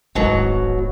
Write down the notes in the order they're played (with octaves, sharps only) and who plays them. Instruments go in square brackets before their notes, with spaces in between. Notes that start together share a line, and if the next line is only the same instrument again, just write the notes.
[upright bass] D1 G#1 [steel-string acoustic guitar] G#2 B2 F#3